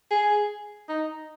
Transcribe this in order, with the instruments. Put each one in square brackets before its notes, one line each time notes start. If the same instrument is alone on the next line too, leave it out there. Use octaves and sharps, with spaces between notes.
[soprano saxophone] G#4
D#4